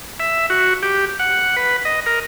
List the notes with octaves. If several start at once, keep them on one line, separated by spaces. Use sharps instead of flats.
E5
F#4
G4
F#5
B4
D#5
A#4